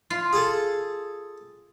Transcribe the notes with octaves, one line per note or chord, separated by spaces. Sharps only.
F4
G#4 A4